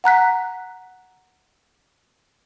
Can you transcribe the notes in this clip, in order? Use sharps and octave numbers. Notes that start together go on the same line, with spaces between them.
F#5 A#5 F#6 B6